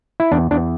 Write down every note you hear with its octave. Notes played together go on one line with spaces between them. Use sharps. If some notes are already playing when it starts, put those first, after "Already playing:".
E4
E2 D4
E2 D4